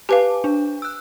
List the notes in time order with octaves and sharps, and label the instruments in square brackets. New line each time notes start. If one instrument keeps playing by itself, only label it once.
[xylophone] G4 B4 F5 [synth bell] G#5 A5 D6
[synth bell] D4
E6 F#6